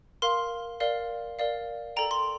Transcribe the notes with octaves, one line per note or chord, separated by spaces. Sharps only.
A#4 F5 C6
A#4 D5 F5
A#4 D5 F5
A4 D5 G5 A#5
C6